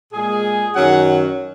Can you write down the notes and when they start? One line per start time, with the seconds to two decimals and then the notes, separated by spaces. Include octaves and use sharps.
0.13 A#2 G#3 G#4
0.74 F#2 D#3 F#3 F#5